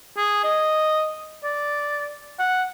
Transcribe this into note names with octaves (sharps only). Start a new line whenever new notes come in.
G#4
D#5
D5
F#5